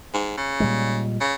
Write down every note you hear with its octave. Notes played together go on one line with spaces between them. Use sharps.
G#2
C#3
A#2 G3 G#3
C#3